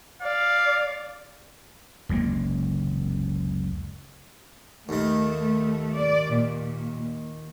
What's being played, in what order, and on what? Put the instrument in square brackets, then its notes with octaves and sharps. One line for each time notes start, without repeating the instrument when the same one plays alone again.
[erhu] D5 [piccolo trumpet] F5
[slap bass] F#1 C#2 C3 A#3
[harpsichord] D#2 D#3 [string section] A3
[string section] D5
A#2